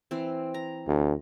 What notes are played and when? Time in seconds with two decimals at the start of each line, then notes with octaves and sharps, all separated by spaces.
0.11 E3 C4
0.54 A#5
0.88 D2